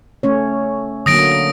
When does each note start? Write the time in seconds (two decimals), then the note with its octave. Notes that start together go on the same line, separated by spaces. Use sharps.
0.23 A3 C#4 C#5
1.06 D3 F#3 A#3 D#6 A#6 D7